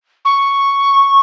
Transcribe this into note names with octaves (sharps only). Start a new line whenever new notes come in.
C#6